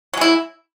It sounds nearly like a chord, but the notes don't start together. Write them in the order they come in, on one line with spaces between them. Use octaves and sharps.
F#3 G#3 E4